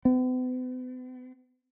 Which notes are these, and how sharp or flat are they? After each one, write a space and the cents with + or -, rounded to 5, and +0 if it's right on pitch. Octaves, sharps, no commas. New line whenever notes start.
B3 +45